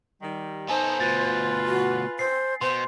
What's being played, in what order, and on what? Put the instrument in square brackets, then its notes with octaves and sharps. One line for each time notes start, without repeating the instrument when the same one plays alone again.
[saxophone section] D#3 G3
[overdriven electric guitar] B3 A4 [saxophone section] D#4 [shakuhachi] C5 [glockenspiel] G#5
[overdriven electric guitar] D2 B2 [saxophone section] F4 B4 [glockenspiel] A6
[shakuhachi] F#4
[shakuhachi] C5 [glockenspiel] C7
[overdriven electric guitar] B2 [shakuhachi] C5 [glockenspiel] C6